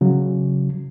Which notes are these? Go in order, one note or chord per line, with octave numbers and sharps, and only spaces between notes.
C#3 F#3